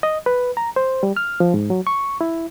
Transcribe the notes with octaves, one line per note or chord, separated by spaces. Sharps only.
D#5
B4
A#5
C5
G3
F6
F3
G#2
F#3
C#6
E4